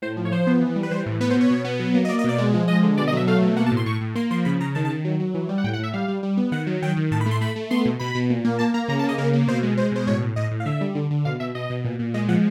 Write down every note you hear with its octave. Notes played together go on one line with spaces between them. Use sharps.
A2 C5
F3
C#5
F3 C5
B3
E3
G3
B4
E3 C5
A2
B3 B4
C5
B2
C#5
B2
B3
F#3
A#3
D#5
A#3 D5
D#5
B2 D5
G#3
F3
G#3 D#5
D3
B2 D5
D#5
F#3 E5
A3 F5
B2
A#3 F#5
A5
A2
C6
A2 C#6
A2
A#3 C6
F3 C6
C#3 B5
C#3 A#5
D#3 A5
A5
D#3
F#3
F#3
E3
G3
F#5
A2 G5
F#5
A2 E5
G3 F5
G3
G3
B3
D#3 F#5
F#3
D#3 G5
D#3
A2 A5
B5
A3 C6
A3 B5
A3
B3 C6
B2
B2 B5
B2
A#2
A#3
A#3 A5
A#3 A#5
C#3 A#5
A5
A#3
D#5
C#3 A#4
A#3
B2 C5
G#3
G#3 C5
B2 C5
A2 C#5
A2
A2 D#5
A2
F5
D3 E5
G3
D3
D3
B2 F5
B2 E5
B2 D#5
B2
A#2
A#2
G#3 D#5
F3 F#5